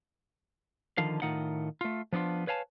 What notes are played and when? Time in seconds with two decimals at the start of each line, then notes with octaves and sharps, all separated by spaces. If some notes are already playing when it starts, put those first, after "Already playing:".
0.98 D3 D#3 F3 F5
1.22 A2 D#3 D#4 F4 F#5
1.81 A3 F4
2.13 F3 B3 D4 D#4 F4
2.47 B4 C#5 F5 G#5 A5